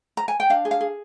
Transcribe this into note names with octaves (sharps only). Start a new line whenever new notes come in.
A#5
G#5
G5
D4 F5
G#4
F5
G#4